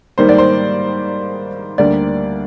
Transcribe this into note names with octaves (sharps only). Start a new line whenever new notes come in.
G#2 D#3 G3 A#3 C5
D5
C5
D2 D3 G3 A#3 D5